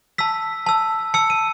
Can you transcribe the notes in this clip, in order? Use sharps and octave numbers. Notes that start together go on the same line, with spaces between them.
A5 E6 B6
A5 E6
A5 E6 C#7
D#7